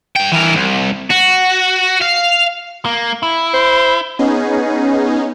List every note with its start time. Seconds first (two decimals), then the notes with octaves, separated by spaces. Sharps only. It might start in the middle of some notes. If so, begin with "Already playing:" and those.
0.16 G2 G5
0.32 E3 A#4
0.55 C2
1.10 F#4
2.01 F5
2.85 A#3
3.23 E4
3.54 C5
4.19 B3 C#4 D#4 G#4